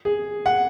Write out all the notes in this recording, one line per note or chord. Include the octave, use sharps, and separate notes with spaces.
G#4
F#5